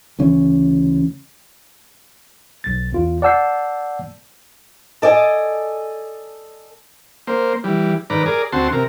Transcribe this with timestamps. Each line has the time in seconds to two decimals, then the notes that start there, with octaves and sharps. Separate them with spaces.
0.19 D2 C#3 E3 C#4
2.64 B1 A6
2.93 E2 F4
3.22 D5 F#5 A5 E6 G6 C7
5.02 A4 D5 D#5 G#5
7.27 A#3 C5
7.64 E3 G3
8.10 G#2 D#3 B4 D5 A#5
8.26 G#4 A#4 D5
8.52 D2 C4 F#4 A5 C6
8.73 C3 A#4